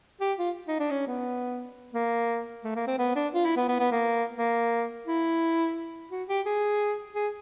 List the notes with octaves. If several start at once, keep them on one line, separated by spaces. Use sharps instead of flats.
G4
F4
D#4
D4
C#4
B3
A#3
A3
A#3
C4
B3
D4
F4
E4
B3
B3
B3
A#3
A#3
E4
F#4
G4
G#4
G#4